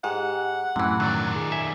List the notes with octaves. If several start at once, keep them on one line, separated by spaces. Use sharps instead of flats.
G#2 G4 G#4 F#5
F#2 A2 C3 E3
D#3 F#3 D5
G#4
E5 G#5